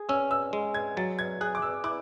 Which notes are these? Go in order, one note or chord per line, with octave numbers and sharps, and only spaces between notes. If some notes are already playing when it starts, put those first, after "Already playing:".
Already playing: G#4
C#4 E6
E6
G#3
G#6
F#3 A6
G#6
G#4 F#6
D6
E6
E4 D6